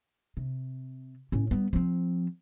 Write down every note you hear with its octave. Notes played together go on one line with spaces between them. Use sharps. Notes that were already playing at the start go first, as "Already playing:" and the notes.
C3
A2 C#4
G3 B3
F3 C4